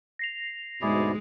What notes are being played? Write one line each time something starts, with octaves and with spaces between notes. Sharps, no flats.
A#6 C7 F7
D2 G#2 B2 G#3 E4 G#4 D5